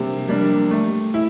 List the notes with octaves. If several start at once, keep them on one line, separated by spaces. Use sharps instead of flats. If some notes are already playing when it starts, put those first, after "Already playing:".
Already playing: C3 G3 A#3 D4
G3 A#3 D4
A3
E4